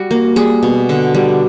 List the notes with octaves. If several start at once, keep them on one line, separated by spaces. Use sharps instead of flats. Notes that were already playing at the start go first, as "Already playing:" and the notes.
Already playing: G3 F#4
A#3
G3 G#4
B2
D3
G3